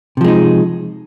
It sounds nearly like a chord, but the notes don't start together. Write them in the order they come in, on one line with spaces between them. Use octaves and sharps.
C3 F3 G#3 D#4